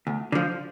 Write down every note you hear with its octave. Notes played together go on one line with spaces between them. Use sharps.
D2
D3 F3